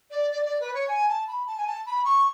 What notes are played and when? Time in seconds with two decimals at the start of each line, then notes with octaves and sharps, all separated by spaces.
0.10 D5
0.30 D5
0.45 D5
0.60 B4
0.74 C#5
0.88 G#5
1.08 A5
1.27 B5
1.46 A5
1.57 G#5
1.67 A5
1.86 B5
2.04 C#6